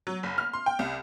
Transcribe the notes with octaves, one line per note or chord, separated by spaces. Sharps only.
F#3
F#1
F6
C6
G5
C2